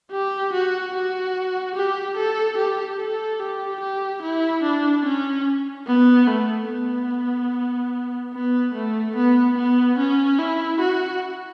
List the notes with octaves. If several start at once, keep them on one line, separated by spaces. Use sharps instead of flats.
G4
F#4
F#4
G4
A4
G4
A4
G4
G4
E4
D4
C#4
B3
A3
B3
B3
A3
B3
B3
C#4
E4
F#4